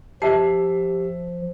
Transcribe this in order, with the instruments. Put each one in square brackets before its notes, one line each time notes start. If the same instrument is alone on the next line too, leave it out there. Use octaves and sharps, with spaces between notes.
[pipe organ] F3 [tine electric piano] G4 [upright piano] E5 C7 [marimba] A5